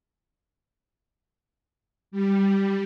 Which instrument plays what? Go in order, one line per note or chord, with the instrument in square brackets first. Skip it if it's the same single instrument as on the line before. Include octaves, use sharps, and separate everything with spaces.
[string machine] G3